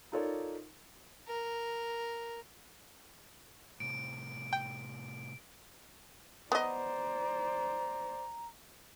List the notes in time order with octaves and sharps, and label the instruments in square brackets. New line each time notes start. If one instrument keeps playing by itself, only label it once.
[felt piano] D#4 F4 A4 A#4 C#5 D5
[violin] A#4
[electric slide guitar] A2 C3 [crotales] D7
[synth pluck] G5
[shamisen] B3 D#5 [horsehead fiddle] C5 D5 [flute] A#5